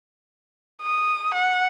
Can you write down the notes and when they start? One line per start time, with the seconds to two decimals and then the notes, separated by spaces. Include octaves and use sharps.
0.82 D#6
1.34 F#5